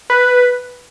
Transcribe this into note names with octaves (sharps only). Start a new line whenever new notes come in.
B4